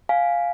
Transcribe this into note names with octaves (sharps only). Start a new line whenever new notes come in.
F5 G#5